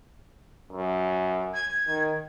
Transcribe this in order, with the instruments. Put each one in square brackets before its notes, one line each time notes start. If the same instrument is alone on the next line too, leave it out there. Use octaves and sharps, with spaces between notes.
[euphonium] F#2
[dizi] G#6
[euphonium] D#3